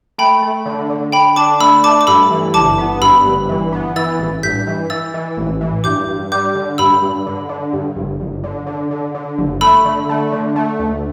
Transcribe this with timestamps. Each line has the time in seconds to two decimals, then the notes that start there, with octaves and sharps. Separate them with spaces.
0.18 A3 G5 B5
0.42 A3
0.66 D3
0.90 D3
1.12 D3 G5 B5
1.36 D4 A5 D6
1.60 A3 B5 E6
1.84 A3 A5 D6
2.01 D6
2.07 G2 B5 E6
2.31 E3
2.54 G1 A5 D6
2.78 B3
3.02 G2 B5 E6
3.26 G1
3.49 E3
3.72 B3
3.96 E3 E6 A6
4.19 A1
4.43 G2 G6 B6
4.67 E3
4.90 E3 E6 A6
5.14 E3
5.38 A1
5.61 E3
5.84 G2 D6 G6
6.08 G2
6.32 G3 D6 G6
6.55 D3
6.78 G2 B5 E6
7.02 G2
7.26 D3
7.49 D3
7.73 G2
7.96 G1
8.20 G1
8.44 D3
8.67 D3
8.91 D3
9.15 D3
9.38 G1
9.61 A3 B5 E6
9.85 D3
10.09 A3
10.32 D3
10.56 A3
10.79 D2